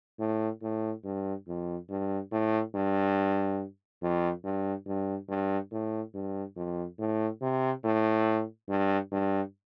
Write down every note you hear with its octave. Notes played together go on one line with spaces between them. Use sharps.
A2
A2
G2
F2
G2
A2
G2
F2
G2
G2
G2
A2
G2
F2
A2
C3
A2
G2
G2